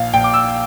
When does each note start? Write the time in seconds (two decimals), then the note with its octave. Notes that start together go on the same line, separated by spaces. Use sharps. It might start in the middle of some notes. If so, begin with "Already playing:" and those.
Already playing: A#1 F5
0.14 A#1 G5
0.24 D6
0.34 E6